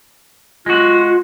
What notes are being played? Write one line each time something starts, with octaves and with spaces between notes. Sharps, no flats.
G#3 F4 F#4